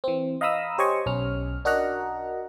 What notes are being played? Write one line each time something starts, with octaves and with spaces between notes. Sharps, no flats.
E3 C4
D#5 F5 A#5 B5 D#6 E6
G4 C5 C#5 D#5 G#5 C#6
B1 C#4 F6
D4 F#4 A#4 D#5 F#5 A#5